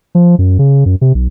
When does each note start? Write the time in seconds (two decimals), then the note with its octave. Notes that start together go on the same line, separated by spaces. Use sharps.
0.15 F3
0.38 F#2
0.59 C#3
0.86 F#2
1.01 C3
1.15 B1